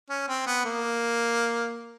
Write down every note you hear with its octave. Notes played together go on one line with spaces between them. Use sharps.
C#4
C4
B3
A#3